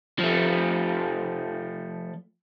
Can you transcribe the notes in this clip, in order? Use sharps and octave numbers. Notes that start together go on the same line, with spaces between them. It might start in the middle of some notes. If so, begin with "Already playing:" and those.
F3 A3